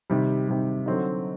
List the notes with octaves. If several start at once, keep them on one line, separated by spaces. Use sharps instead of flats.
C3 D#3 G3
C3 D#3 G3
D3 F#3 C4 D#4